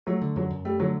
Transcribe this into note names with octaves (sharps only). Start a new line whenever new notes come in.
F#3 A3
D3
F#2 F#3
F#2
G3 A3
D3 F#3